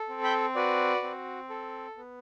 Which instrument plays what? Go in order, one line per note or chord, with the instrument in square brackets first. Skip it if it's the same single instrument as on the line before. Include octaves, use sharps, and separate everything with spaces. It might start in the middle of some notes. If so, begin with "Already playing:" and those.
Already playing: [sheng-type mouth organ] A4
C4
G5 B5
F#4 B4 D5
C4
A4
B3